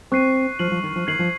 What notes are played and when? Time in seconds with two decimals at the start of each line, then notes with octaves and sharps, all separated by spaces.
0.12 C4 C#6 F#6 C7 D#7
0.59 F3 F6 C7 D#7 F#7
0.71 F3
0.83 D#3
0.96 F3
1.07 D#3 G#6 C7 F#7
1.19 F3